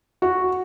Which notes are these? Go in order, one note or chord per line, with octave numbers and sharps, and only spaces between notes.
F#4